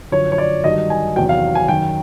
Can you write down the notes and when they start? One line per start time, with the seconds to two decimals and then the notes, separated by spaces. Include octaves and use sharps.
0.12 F#2 D3 F3 C#5
0.32 C#5
0.38 D5
0.64 G2 D#3 F#3 D#5
0.90 G#5
1.16 E2 C3 D#3 F#3 G5
1.29 F5
1.55 G#5
1.68 F#2 D#3 F#3 G5